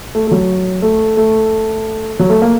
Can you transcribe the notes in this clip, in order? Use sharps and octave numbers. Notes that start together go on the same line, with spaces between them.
A3
A3
F#3
A3
A3
F#3
A3
A#3